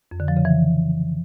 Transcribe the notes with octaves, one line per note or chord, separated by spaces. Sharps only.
F2
D3
F3
C#3
E3